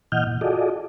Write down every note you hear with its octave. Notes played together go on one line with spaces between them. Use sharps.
A#2 E3 D#5 F#5 F6 G6
A#2
F4 F#4 G#4 A4 D5 D#5